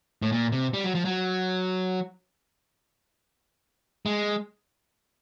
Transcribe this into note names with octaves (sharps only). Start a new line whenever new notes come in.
A2
A#2
C3
G3
F#3
F3
F#3
G#3